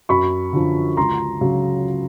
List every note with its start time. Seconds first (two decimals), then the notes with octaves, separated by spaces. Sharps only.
0.09 F#2 B5 C#6
0.53 D3 F3
0.97 C#2 A#5 C6
1.41 C#3 F#3